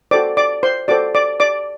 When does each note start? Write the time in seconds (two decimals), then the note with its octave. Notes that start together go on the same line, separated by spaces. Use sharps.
0.11 F#4 A4 C5 D5 D6
0.37 D5 D6
0.63 C5 C6
0.88 F#4 A4 C5 D5 D6
1.15 D5 D6
1.40 D5 D6